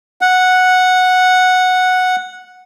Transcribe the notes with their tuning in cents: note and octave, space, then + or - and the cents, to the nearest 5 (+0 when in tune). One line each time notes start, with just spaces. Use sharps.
F#5 -5